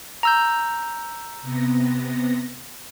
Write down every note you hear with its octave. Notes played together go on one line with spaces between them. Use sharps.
A#5 E6 G6
C3 B3 A#6